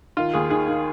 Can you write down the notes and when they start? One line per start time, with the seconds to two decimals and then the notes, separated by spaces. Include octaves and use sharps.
0.17 D#3 F4
0.33 D#2 G#4
0.50 D#3 G#4
0.68 D#3